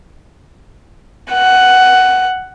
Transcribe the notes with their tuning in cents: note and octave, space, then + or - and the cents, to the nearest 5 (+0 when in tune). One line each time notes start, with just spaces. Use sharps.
F#5 +10